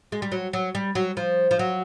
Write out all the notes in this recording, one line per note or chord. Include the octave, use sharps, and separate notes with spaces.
G#3
G3
F#3
F#3
G3
F#3
F3
F3
F#3